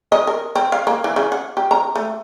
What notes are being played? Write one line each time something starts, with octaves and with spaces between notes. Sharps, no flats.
D#5
A#4
C4
F5
A#3
E3
C#3
F#5
G4
A#5
A3